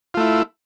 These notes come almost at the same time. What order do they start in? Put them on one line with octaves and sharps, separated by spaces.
F4 A3 E4